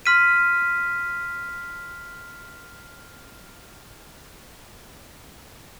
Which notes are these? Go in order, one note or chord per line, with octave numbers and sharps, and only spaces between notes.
C6 F6 B6 D#7